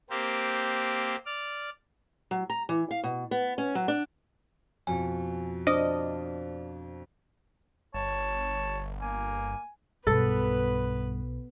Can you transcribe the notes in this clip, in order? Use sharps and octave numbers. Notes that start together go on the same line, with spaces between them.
A#3 C4 G4
D5 F6
F#3
A#5
E3
F5
B2
B3
C#4
F#3
D4
F2 B2 G#5
D4 C5 D#5 D6
G1 C#5 A5
A#3 G#5
B1 G2 B2 B3 A4 B4